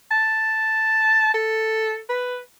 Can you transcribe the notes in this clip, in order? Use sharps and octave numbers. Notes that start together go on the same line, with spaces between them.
A5
A4
B4